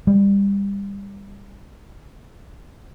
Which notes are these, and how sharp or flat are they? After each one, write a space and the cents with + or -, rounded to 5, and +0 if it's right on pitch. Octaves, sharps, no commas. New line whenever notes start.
G3 +25